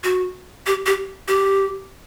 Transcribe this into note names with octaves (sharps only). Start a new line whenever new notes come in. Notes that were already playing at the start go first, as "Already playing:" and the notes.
F#4
G4
G4
G4